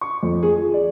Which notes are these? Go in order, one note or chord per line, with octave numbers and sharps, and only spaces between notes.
C#6
F2
G#4
F3
D5